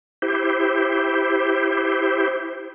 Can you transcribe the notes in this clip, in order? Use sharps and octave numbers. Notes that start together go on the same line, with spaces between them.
E4 G4 C5